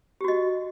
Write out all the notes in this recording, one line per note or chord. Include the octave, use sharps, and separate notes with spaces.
F#4 G4 D#5